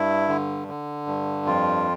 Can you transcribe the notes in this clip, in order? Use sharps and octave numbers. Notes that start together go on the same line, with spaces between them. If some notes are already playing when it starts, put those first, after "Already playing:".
Already playing: G2 E4
D3
D3
G2
F2 F4